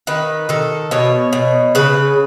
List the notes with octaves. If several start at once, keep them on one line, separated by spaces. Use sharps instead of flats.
D#3 B4
D#3 A4
B2 C#5
B2
C#3 B4